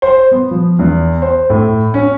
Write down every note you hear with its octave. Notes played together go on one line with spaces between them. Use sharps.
C5
B3
F3
E2
C5
A2
C#4